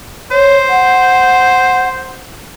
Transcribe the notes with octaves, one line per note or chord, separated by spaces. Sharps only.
C5 C#5
F#5